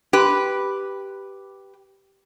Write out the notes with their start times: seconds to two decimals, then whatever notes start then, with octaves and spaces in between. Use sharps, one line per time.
0.13 G4 B4